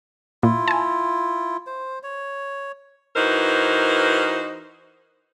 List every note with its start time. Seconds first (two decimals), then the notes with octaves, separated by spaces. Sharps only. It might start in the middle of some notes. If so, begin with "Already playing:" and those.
0.43 A#2 E4 F4
0.68 G#5 A5
1.66 C5
2.03 C#5
3.16 E3 D#4 F#4 A#4 C5